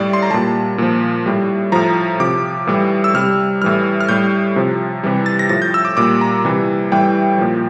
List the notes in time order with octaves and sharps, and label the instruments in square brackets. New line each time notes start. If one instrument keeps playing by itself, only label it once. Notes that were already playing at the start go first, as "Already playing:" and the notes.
Already playing: [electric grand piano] A2 G3 D5
C6
A#5
A#2 G3 A5
A#2 F3
A2 G3
A2 F3 A#5
C3 F3 D6
A2 E3 G3
E6
C3 G3 F6
A2 E3 G3 F6
F6
A2 G3 G6
C3 F3
C3 E3 G3
A6
A#6
A2 F3 A6
G6
E6
D6
A#2 G3 D6
A#5
C3 E3 G3
A2 E3 G3 G5
A#2 F3